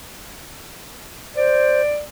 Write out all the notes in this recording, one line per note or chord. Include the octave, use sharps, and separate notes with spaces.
C5 D5